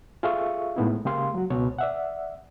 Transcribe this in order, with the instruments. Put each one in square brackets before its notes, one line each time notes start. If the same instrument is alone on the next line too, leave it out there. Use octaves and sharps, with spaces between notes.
[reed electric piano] F4 G#4 A4 E5 F5 C#6
A2 G#3 A3 B3 D#4 E4
C#3 G#3 A#3 G4 F5 C6
F#3 F#4
C#2 B2 C#5
D5 E5 F#5